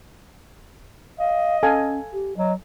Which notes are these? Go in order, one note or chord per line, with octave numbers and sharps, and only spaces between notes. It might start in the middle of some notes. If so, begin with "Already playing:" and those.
D#5 F5
C#4 A4 F5 G#5
G4
F#3 D#5